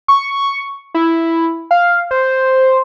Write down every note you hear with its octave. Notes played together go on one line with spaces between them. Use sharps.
C#6
E4
F5
C5